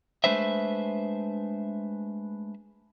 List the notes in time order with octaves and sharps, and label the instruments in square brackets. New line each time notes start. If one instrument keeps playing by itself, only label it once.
[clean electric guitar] G#3 A3 D4 B4 C5 E5